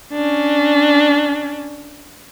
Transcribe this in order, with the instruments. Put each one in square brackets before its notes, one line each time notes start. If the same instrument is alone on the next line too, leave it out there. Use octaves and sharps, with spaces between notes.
[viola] C#4 D4